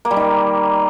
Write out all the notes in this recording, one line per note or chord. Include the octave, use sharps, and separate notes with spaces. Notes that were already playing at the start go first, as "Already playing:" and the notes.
A#3
G3
D#3